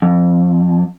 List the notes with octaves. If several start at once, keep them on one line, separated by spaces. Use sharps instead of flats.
F2